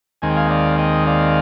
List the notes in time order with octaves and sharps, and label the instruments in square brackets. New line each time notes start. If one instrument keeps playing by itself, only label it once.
[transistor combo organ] D#2 D#3 G#3 C4 G#5
G5
F5 G#5
D5 F5
D#5 G5
D5 F5